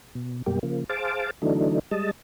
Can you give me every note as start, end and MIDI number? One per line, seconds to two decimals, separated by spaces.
0.15 0.42 47
0.46 0.59 42
0.46 0.59 47
0.46 0.59 55
0.46 0.59 58
0.46 0.59 67
0.63 0.84 49
0.63 0.84 53
0.63 0.84 58
0.89 1.31 68
0.89 1.31 72
0.89 1.31 77
0.89 1.31 81
0.89 1.31 86
1.42 1.79 50
1.42 1.79 52
1.42 1.79 54
1.42 1.79 57
1.42 1.79 62
1.42 1.79 63
1.91 2.11 55
1.91 2.11 56
1.91 2.11 75
1.91 2.11 81